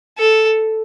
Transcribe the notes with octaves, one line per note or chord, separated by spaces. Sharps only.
A4